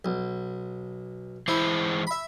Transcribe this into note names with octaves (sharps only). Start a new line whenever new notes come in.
B1
E3 G#3 E4 C5
E5 B5